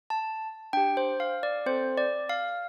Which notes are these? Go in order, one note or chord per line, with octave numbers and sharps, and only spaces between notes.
A5
D4 G4 G5
C5
F5
D5
C4 A4 C5
D5
F5